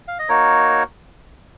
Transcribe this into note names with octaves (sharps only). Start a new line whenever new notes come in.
F5
D#5
A#3 D#4 F#4 A#4 C#5